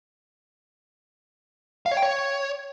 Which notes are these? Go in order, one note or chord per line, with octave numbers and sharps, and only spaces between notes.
F5
C#5
G5
C#5